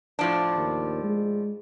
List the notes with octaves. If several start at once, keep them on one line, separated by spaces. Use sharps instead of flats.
A2 F3 D4
D#2
G#3